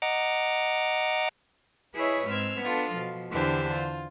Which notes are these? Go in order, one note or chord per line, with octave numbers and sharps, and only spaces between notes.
D#5 F#5 A#5 D6
E4 G#4 B4 C#5 D#5 E5
G#2 C4 E6 F6 G#6
B3 D4 F4 A4
B2 F3
E2 D3 E3 D4 G4 C5
F4